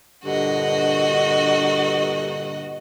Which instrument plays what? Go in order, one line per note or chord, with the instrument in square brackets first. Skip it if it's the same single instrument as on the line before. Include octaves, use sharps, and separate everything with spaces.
[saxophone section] G2 A#2 D3 [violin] F#4 D#5